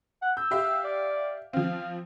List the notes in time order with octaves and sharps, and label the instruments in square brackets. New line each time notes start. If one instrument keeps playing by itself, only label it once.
[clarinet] F#5
[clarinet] E6 [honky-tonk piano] G6
[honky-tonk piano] G4 E5 F5
[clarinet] D5
[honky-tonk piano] F3 C4 [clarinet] F5